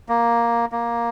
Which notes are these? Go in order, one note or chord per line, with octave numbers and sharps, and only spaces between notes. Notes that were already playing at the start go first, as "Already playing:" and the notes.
A#3
A#3